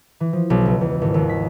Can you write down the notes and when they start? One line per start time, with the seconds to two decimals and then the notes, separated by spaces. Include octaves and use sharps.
0.20 E3
0.33 F3
0.50 B1
0.65 C#2
0.81 E2
1.02 G#1
1.14 D#2
1.29 B6